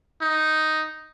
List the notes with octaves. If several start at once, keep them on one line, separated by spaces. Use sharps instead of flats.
D#4